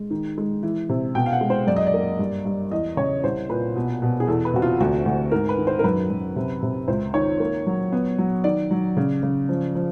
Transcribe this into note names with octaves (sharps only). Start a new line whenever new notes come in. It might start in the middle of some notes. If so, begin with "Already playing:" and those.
Already playing: G#3
D#3
G#3
E3
C3
B2 G5
F5
F#5
G#3
C5
F#2 D5
D#5
D5
A#3
G2
G2
E2 D#5
C#3 C#5
C2 C5
A#2 B4
B2
B2
G#4
E2 A4
B4
C3 F#4
F4
D2 F#4
D2
G#2 A#4
B4
D#3
C5
A#4
F#2 B4
F#2
C3
C3
C#2 C5
D#3 C#5
A#3
F#3
B3
F#3
D#3 D5
F#3
C#3
C#3
F3
F3